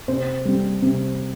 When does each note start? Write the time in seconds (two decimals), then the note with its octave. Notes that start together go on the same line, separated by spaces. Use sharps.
0.08 C3 C5
0.45 G3 C4
0.82 C3